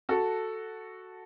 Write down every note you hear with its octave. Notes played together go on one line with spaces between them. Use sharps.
F#4 A4